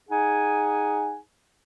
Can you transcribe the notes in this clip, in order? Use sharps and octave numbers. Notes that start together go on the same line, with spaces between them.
D#4 G#4 F#5 G#5